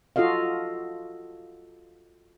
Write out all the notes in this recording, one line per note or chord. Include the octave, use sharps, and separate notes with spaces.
F4 F#4 A4 D#5 F5